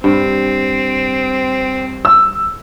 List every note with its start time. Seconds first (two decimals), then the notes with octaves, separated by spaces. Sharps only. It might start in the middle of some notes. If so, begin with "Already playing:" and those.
0.04 G2 C4
2.05 E6